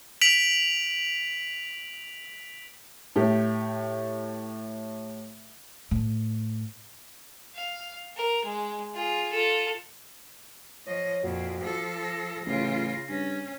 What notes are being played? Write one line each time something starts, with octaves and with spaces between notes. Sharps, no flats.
B6 D7 F7 F#7
A2 G4
A2
F5
A#4
G#3
F4 G#4
F4 A4
F3 C#5 D#5
F2 A#2 F#4
F3 A4
A#6
A1 C#3 F4
G2 C#4